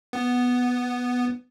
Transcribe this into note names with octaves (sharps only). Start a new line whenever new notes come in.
B3